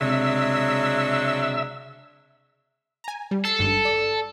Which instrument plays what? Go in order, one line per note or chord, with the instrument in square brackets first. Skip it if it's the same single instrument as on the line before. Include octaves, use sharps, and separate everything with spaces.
[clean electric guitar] C#2 C3 [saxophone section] F#3 G#3 D4 [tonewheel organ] E5 E6
[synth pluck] G#5 A#5
G3
[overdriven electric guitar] A4 [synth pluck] C7
[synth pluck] G#1 G2
D5